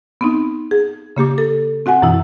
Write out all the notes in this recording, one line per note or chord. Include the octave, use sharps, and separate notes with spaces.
B3 C4 D#4
G#4
C#3 A#3 G4 D6
A4
C4 F#4 F#5 G#5
F#2 B2 E3 E4 E6